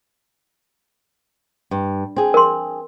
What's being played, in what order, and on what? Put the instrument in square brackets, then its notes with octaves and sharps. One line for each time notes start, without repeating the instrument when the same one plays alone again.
[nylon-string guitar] G2
C4 G#4
[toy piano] A#4 C6